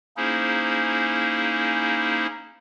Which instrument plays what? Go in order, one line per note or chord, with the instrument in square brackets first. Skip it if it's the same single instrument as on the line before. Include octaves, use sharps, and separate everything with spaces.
[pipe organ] A#3 C#4 D#4 E4 G#4 C5